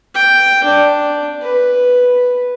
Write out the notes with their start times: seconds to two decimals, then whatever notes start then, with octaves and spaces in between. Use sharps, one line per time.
0.15 G5
0.64 D4
1.42 B4